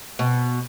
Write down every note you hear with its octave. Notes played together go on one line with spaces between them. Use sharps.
B2